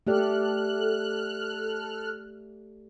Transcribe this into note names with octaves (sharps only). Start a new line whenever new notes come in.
A3 G4 A4 D5 F6 F#6